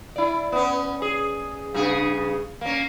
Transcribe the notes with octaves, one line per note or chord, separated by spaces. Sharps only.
E4 D5
B3 C#4
G#4
G2 C#3 G#4
A#3 C#4